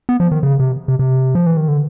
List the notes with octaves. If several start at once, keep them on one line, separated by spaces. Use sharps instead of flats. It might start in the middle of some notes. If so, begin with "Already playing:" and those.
B3
F3
D#3
C#3
C3
C3
C3
F3
E3
D#3
D3